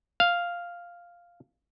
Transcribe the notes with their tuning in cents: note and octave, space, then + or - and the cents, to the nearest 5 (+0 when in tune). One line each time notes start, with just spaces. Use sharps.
F5 +0